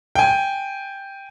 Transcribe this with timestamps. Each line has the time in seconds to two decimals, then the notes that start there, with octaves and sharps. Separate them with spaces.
0.15 G5 G#5